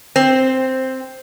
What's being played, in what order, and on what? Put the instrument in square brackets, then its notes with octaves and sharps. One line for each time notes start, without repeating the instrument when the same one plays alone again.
[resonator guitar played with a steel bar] C4